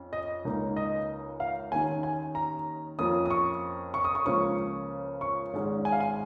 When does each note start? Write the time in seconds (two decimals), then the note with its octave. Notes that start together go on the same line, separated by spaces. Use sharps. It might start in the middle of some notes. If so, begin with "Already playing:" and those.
Already playing: F2 C#4
0.13 D#5
0.45 C#2 C#3 A#3 D#4
0.76 D#5
1.40 F5
1.72 D#2 D#3 C#4 G#5
2.03 G#5
2.35 A#5
2.99 F2 F3 A#3 C#4 D#6
3.26 D#6
3.30 C#6
3.94 C#6
4.05 D#6
4.15 C#6
4.26 C#2 C#3 F3 A#3 C#4 C#6
5.21 C#6
5.53 G#1 G#2 G#3 C#4
5.85 G#5
5.92 F5
6.00 G#5